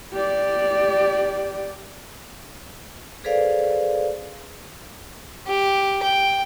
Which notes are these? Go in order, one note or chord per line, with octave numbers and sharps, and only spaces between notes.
G4 D5
G#4 A4 B4 C5 D5 F5
G4
G5